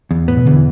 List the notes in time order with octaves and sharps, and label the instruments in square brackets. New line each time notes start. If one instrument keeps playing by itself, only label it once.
[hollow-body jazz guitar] E2
[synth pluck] A2 [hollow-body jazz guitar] B3
[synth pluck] B2
[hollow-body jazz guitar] E2 [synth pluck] D3
[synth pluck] E3